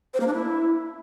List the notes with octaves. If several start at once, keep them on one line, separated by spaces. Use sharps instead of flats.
C5
A#3
D4
E4